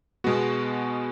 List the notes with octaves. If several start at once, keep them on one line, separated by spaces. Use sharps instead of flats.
B2 G#3 B3 F#4